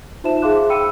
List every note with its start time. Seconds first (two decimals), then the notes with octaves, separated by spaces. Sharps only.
0.24 D#4 F4 C5 E5 A5 E7
0.42 G#4 E5 F5 C6 D6 F#6
0.69 F5 G5 B5 E6 C#7 D#7